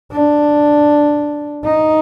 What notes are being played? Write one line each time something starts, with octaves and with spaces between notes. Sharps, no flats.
D4
D#4